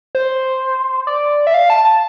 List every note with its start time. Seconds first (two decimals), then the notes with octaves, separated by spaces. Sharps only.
0.15 C5
1.07 D5
1.47 E5
1.54 F5
1.70 A5
1.85 A5